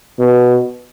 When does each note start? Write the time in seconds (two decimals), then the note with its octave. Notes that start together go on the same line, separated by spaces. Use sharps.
0.19 B2